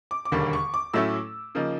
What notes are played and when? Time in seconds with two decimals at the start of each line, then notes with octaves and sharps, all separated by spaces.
0.11 D6
0.25 D6
0.32 E1 D#2 D3 G3 A#3 C#6
0.53 C#6
0.74 D6
0.93 A2 F#3 A3 C#4 E4 E6
1.55 C#3 F3 A#3 D#4